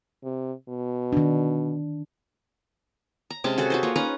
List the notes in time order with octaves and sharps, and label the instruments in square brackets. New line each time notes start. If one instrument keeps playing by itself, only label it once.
[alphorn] C3
B2
[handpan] D#3 D4
[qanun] A#5
C3 G#3 C#4 A5
F#4 G#4 A4
F#4 B4 C5
A#3 F4 C#5
C#4 D#4 B4 A#5